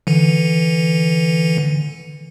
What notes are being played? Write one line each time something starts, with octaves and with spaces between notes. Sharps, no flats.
D3 E3